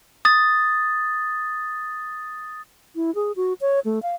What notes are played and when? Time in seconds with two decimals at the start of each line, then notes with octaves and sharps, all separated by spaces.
0.25 D#6 A6
2.96 E4
3.15 G#4
3.36 F#4
3.61 C#5
3.85 A3
4.03 F5